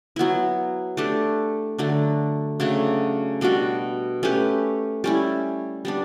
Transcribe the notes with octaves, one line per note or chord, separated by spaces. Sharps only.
F#3 B3 E4
A3 D4 G4
D3 F#3 A3 D4
C#3 F#3 A3 D4
B2 G3 D4 F#4
A3 C#4 G4 B4
G3 C#4 E4
G3 B3 D4